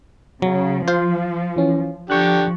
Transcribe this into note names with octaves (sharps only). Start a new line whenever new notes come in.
C#3 F#3
F3 F4 C5
E3 C#4
D3 F3 G4 C#6 F#6